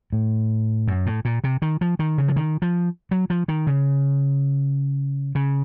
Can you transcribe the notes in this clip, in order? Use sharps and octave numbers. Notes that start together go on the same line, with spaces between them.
A2
F#2
A2
A#2
C3
D#3
F3
D#3
C#3
F3
D#3
F3
F#3
F3
D#3
C#3
C#3